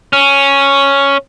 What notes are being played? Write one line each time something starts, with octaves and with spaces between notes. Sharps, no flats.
C#4